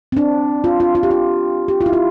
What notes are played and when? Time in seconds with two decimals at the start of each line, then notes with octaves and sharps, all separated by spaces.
0.12 C4
0.17 D4
0.64 F4
0.80 F4
0.95 F4
1.03 G4
1.10 F4
1.68 G4
1.81 F4
1.86 E4
1.93 F4